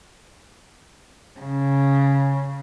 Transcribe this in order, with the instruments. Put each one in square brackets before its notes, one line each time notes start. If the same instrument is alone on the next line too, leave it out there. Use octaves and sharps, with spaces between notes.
[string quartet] C#3